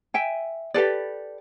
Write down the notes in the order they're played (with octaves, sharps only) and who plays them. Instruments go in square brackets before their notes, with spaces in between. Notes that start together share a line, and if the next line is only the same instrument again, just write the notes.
[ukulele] E5 G5 G#5
G4 A4 B4 D5